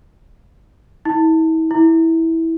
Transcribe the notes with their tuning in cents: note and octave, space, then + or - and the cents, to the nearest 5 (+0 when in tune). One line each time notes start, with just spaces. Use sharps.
E4 -40
E4 -15